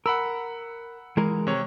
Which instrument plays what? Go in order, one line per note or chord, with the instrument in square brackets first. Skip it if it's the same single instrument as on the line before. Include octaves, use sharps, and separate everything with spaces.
[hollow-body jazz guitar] A#4 [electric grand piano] F#5 B5 E6
[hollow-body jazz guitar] E3 G#3 A#4
[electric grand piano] C3 C#5